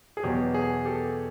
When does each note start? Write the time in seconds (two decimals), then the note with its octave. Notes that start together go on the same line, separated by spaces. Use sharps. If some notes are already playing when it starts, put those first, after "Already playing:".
0.17 G#4
0.23 E2 B2 F#3 G4
0.54 G#4
0.85 G4 A4